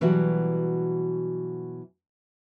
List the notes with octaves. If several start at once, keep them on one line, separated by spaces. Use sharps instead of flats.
B2 E3 F#3 G3 E4 F#4